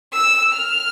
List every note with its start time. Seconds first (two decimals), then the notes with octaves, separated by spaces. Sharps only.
0.13 E6
0.54 F6